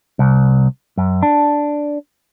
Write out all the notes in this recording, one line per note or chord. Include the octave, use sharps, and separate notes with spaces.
C2
F#2
D4